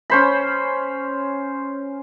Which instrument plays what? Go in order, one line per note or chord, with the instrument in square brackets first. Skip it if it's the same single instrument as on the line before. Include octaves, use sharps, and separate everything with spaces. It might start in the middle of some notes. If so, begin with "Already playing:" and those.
[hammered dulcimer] C#4 C5 B5